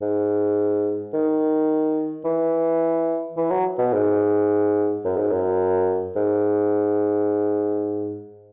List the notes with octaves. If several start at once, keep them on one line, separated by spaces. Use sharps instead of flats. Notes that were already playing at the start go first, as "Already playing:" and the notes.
G#2
D#3
E3
E3
F#3
B2
G#2
F#2
G#2
F#2
G#2